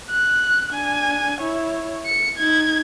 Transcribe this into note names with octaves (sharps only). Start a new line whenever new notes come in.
F#6
D4 G#5
E4 C#5
C#7
D#4 G#6